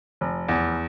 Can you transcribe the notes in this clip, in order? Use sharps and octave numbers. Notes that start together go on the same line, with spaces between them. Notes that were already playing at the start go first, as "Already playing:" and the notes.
F1
E2